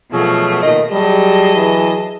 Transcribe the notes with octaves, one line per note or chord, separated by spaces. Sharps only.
B2 F3 F#3 A3 G#4
A#2 D#3 D#5
F#3 G3 G#4 D#5 A5
E3